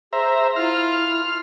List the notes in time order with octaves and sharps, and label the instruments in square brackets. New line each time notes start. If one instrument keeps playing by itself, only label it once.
[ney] G#4 [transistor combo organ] C5 E5 A#5
[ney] E4 [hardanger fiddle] F4 [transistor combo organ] F6